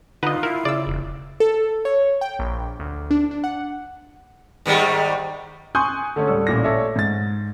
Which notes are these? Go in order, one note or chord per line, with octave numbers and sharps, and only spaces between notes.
D3 D#4 F4 B4 D#5 F#5 A#5
E4 A#4
C#3 D5 E6
E1
A4
C#5
G5
A#1
D2
D4
D4
F#5
G#2 D#3 G3
G#5 C6 C#6 D#6 F#6 G6
D3 A3 C#4
D1 G3 A4
A1 A#2 A#6
A4 C#5 D5 E5
G#2 A6